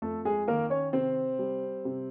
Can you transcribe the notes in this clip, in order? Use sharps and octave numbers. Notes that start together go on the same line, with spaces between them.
F2 A3 A4
G#3 G#4
D#3 A#3 A#4
C#4 C#5
C3 C4 C5
G3
C3